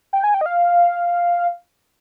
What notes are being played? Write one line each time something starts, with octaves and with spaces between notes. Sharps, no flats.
G5
G#5
G5
D#5
F5